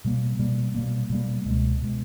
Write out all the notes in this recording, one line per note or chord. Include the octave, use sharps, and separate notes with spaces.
B2 G3 A#3
B2 G3 A#3
B2 G3 A#3
B2 G3 A#3
C#2 B2 G#3
B2 G#3